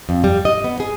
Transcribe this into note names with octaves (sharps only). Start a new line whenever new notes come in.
F2
G3
D#5
B3
G#4